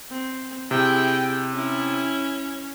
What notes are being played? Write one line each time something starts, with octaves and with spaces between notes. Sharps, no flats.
C4
C3 E4 G#4 G5
C#4 E4